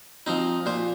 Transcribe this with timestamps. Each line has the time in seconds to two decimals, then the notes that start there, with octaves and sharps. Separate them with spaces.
0.26 F3 C4 D#4
0.66 A#2 C5